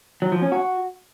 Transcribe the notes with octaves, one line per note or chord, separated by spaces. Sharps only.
F#3
F3
C#4
F#4